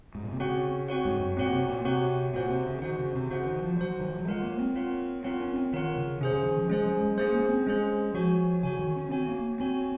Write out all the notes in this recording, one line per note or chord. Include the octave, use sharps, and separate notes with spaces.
G#2
A#2
C3
C#3 C4 F#4 C#5 F#5
C4 F#4 C#5 F#5
G#2
F#2
A#2 C4 F#4 C#5 F#5
C3
A#2
C3 C4 F#4 C#5 F#5
A#2 F#4 C5 F#5
C3
C#3
D#3 F#4 C5 F#5
C#3
C3
C#3 F#4 C5 F#5
D#3
F3
F#3 F#4 C5 F#5
D#3
F3
F#3
G#3 F4 A#4 C#5 F#5
A#3
C4
F4 A#4 C#5 F#5
C4 F4 A#4 C#5 F#5
C#4
C4
D#3 F4 A#4 C#5 F#5
C#3
C3 C#4 G#4 C5
C#3
D#3
F3
G#3 C#4 G#4 C5
F#3
G#3
A#3 C#4 G#4 C5
A#3
C4
G#3 C#4 G#4 C5
F3 F#4 C#5 G#5
C#3 F#4 C#5 G#5
D#3
C#4
C4 F#4 C#5 G#5
A#3
C4 F#4 C#5 G#5